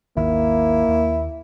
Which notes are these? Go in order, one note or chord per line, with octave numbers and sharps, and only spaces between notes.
G#1 D#2 D#3 A#3 E4
D#2